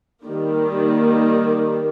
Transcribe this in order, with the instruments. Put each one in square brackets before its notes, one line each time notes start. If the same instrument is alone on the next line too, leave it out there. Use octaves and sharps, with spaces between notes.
[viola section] D#3 G3 A#3